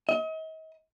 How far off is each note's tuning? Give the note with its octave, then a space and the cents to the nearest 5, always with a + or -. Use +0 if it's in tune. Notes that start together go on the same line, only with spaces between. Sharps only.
D#5 +40